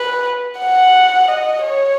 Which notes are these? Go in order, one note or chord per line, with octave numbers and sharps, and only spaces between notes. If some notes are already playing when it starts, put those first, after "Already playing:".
Already playing: B4
F#5
D#5
C#5